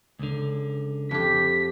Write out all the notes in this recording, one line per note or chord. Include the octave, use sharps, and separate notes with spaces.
C#2 D3
F2 G4 B6